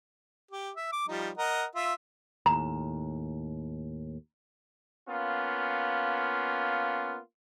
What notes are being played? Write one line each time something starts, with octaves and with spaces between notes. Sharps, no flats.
G4
E5
D6
F3 G3 D#4
A#4 D#5 F#5
F4 E5
D#2 A2 A#5
A#3 B3 C#4 F4